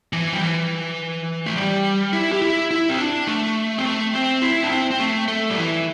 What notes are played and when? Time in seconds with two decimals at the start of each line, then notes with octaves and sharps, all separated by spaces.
0.13 E3
0.33 G3
0.41 E3
1.46 A3
1.56 G3
2.13 E4
2.32 G4
2.42 E4
2.71 E4
2.89 C4
2.98 D4
3.27 A3
3.78 C4
3.85 A3
4.14 C4
4.42 E4
4.64 D4
4.70 C4
4.91 C4
5.00 A3
5.28 A3
5.50 G3
5.57 E3